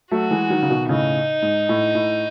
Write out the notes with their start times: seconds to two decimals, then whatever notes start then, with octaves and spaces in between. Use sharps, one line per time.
0.11 F#3 A3 F#4
0.31 E3 G#3
0.50 D#3 F#3
0.62 C#3
0.69 B2 D#3
0.89 A2 C#3 D#4
1.42 G#2
1.69 A2
1.95 A2